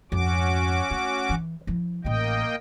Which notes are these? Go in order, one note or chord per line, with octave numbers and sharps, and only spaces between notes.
F2 G#2 C#4 F#4 D6
A3
E3
F3 E4
A1 A3 A#3 D#5 G5